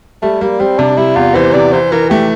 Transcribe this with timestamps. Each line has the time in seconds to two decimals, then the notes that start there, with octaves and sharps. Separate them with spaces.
0.22 G3 A3
0.41 G3 A#3
0.60 G3 C4
0.79 C3 D4
0.97 G3 E4
1.16 E2 F4
1.35 E3 C5
1.54 C3 D5
1.73 E3 C5
1.92 E3 A#4
2.10 A3 G4